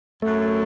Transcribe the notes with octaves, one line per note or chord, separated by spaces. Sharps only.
F#2 A3